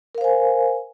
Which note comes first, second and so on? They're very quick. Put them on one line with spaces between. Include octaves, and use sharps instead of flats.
A#4 F5 C5 G#5